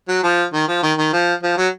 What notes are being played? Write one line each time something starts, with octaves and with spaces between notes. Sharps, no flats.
F#3
F3
D#3
F3
D#3
D#3
F3
F3
F#3